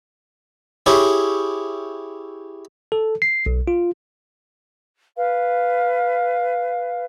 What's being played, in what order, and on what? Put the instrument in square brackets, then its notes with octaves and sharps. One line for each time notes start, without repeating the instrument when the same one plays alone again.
[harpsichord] E4 G4 G#4 C#5
[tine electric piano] A4
C7
B1
F4
[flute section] B4 F5